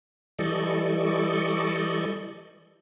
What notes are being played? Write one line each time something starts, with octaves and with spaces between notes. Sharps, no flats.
E3 G3 A4 D5 D#5 C#6